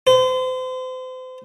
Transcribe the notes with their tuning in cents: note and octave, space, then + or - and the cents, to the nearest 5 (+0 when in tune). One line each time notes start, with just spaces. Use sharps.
C5 -35